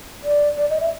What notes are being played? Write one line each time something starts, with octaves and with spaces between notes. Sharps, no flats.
D5
D5
D#5
E5